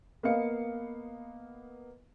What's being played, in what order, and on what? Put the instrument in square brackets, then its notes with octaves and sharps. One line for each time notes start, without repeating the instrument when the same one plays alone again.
[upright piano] A#3 B3 B4 D#5 F5 C#7